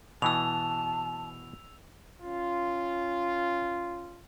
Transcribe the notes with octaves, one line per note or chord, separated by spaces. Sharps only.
B2 E3 A5 E6 F7
C#4 F4